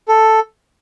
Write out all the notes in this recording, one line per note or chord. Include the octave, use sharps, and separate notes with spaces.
A4